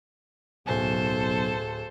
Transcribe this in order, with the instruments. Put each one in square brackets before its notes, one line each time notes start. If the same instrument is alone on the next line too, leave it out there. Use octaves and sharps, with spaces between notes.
[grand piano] D1 G#5 [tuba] B1 [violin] A4 C5